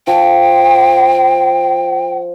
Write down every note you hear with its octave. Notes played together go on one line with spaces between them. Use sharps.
F3 G5